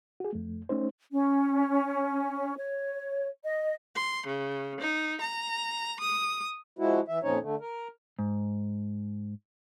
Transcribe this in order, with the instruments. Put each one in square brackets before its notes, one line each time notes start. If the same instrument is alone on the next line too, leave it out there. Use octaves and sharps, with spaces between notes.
[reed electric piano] F#4 G#4
F2 A3
A3 C#4 D#4 C5
[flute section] C#4
C#5
D#5
[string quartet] C6
C#3
D#4
A#5
D#6
[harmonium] F3 G#3 E4 F#4
E3 E5
F2 A#2 F3 C#4 D#4 C#5
D3 A3
A#4
[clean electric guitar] G#2